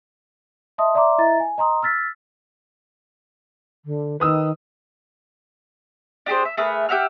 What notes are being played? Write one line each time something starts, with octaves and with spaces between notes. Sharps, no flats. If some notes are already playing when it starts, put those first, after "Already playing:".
D#5 E5 A5 C6 D#6
D5 E5 A#5 C6 D6
E4 D#5 E5 A#5 A6
G#5
D#5 A#5 C6 D#6
E6 F6 A6 B6
D3
D#3 B4 D#6 E6
D4 G4 G#4 C5
E5
A3 G#4 A#4 B4
G4 E5 F#5 F6